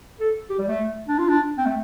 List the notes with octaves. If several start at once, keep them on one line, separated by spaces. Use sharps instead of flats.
A4
G4
G3
A3
D4
F4
D4
C4
A3